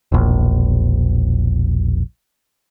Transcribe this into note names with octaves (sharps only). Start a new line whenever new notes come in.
E1 A#1